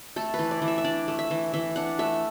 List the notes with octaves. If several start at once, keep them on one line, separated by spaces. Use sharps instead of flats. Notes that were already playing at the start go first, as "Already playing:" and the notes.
A3 A4
B4
E3
D5
E3
E5
E5
D4 D5
A3
E5
E3
E3 E5
D4 F#5
A3 E5